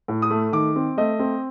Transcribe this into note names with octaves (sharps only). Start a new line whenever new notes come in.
A2
D#6
A3
D#3 D6
C4
A3 D#5
C4